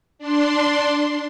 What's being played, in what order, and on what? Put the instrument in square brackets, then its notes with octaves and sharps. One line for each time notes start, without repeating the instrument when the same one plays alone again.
[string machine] D4 C6